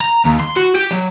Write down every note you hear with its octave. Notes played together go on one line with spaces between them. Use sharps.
A#5
D#2
C6
F#4
G4
F#3